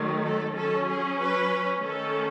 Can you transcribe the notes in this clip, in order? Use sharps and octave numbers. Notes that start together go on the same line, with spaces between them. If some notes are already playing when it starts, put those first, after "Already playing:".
Already playing: D#3 F#3 A3
A4
F#3 C#4 A4
G#4
B4
D#3 A3 C#4 A4